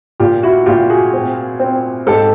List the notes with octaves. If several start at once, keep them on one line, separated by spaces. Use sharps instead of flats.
A#2 F4 G4
E4 F#4
A#2 F4 G4
F#4 G#4
C4
C4
G#2 G4 A4